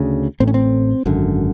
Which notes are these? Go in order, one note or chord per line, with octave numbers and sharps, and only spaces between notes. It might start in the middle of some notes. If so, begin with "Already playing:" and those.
Already playing: D2 C#3
A1 A2 C4
C#4
C4
G#1 F#2 D3